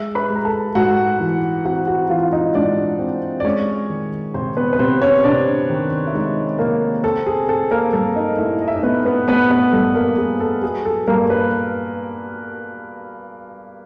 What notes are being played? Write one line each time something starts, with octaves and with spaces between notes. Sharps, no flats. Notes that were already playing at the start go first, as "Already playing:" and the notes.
Already playing: G#3 E5 E6
B4 B5
G#3
A#5
A4 A5
G#2 F#4 F#5
E3
C4 F#4 F#5
F#4 F#5
E3 F4 F5
D#4 D#5
G#2 D4 D5
C4
D5
G#3 C#4 C#5
D#3
C3 C4 C5
B3 B4
B4
C3 C4 C5
C#4 C#5
C3 D4 D5
D#3
E5
G#3 D#4 D#5
C3 A#3 A#4
C4 A4
G#4
C4 A4
A#3 A#4
G2 A4
D#4 D#5
A3 E4 E5
D#5
E5
D#4 D#5
A3 B3 B4
B3 B4
A3 B3 B4
B3 B4
G2 A4
A#3 A#4
G2 G#4
A4
F#3 G#4
A4
G2 A#3 A#4
B4